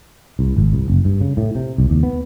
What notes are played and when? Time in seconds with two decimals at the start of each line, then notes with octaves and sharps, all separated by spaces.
0.39 C2
0.56 G#1
0.73 C2
0.88 F#1
1.05 G2
1.21 C#3
1.37 A2
1.55 C3
1.78 C2
1.90 D#2
2.03 B3